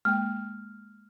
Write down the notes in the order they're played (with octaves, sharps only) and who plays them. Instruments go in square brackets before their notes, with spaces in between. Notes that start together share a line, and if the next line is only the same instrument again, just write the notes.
[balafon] G#3 A#3 G5 [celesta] F6